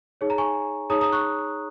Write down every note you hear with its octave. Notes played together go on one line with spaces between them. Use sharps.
D#4 G#4 C#5
A#5
G#5 C#6
D#4 G#4 C#5 A#5 D#6
A#5 D#6
C#6 F#6